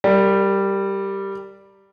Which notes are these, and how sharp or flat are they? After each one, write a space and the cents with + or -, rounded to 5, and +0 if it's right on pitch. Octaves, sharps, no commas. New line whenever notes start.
G3 +0 A#4 -30 D5 +0